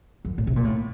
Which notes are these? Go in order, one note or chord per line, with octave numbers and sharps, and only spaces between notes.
F#2
A2
C3
A#2
A2